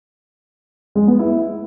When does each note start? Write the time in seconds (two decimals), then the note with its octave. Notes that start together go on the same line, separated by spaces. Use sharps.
0.95 G#3
1.07 B3
1.19 E4